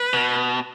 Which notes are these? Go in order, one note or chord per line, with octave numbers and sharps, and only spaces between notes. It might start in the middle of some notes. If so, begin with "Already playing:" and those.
Already playing: B4
B2